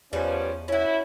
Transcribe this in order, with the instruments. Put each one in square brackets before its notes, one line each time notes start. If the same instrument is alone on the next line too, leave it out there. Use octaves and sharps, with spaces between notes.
[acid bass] E2 [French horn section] F3 C#4 [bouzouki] G3 B4
[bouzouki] C#4 F#4 [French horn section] E4